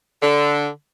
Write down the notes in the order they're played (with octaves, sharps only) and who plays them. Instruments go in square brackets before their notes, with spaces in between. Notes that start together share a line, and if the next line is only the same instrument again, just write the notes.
[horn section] D3